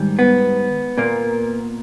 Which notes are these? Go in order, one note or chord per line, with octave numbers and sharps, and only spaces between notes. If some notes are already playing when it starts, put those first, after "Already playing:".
Already playing: G#2 D#3 G3
B3
A#2 A#3